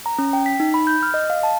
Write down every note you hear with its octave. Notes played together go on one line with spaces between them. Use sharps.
A#5
C#4
G5
B6
D#4
B5
G6
F6
D#5
F5
A5